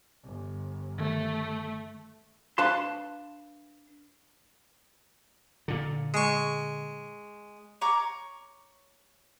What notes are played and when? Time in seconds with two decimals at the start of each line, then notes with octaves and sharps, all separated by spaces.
0.24 G1
0.98 D#3 A3
2.58 D4 B4 F5 A5 C6
5.68 A#2 D3
6.14 G#3 C#6
7.81 C#5 A#5 C#6 D6